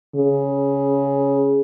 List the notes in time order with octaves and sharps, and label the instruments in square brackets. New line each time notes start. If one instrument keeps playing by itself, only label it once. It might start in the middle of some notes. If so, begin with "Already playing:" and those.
[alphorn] C#3